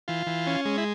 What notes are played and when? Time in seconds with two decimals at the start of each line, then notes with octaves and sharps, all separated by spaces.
0.08 E3 F4
0.27 E3
0.47 C#4
0.65 G#3
0.78 E4